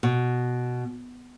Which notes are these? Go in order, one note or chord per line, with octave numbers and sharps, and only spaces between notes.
B2